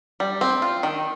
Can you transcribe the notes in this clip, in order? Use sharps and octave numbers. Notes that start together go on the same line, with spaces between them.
G3
C4
F4
D#3